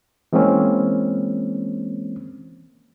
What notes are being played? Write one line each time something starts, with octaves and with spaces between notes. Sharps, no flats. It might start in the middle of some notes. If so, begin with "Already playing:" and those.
E3 G#3 A#3 C4 C#4